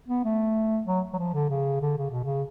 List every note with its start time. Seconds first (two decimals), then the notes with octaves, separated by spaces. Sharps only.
0.09 B3
0.24 A3
0.86 F#3
1.14 F#3
1.18 F3
1.34 D3
1.49 C#3
1.81 D3
1.98 C#3
2.10 B2
2.24 C#3